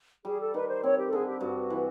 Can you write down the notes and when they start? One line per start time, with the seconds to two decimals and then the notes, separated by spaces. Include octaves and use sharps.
0.25 G3 G#4
0.40 A4
0.54 D#3 B4
0.69 C5
0.83 C4 C#5
0.97 G4
1.08 A4
1.12 D3 G#4
1.27 G4
1.41 G2 F#4
1.70 E3